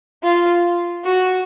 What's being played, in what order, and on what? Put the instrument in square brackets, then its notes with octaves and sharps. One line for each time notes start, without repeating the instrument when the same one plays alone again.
[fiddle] F4
F#4